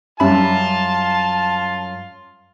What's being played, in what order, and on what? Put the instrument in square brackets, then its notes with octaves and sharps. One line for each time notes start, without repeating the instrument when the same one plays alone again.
[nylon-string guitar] F#2 G3 E5 [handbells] C#4 B5 [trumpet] F4 [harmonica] A5